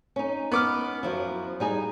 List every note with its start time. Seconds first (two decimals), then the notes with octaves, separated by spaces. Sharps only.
0.16 C#4 D#4
0.52 B3 D6 F6
1.03 F#2 F3 E4
1.60 G3 D#4 G#4